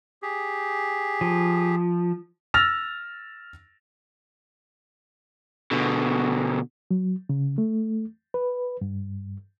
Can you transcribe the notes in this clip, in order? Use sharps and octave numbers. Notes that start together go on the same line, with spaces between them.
G4 G#4
F3
E6 F6 A6 A#6 F7
B2 D3
F#3
C#3
A3
B4
G2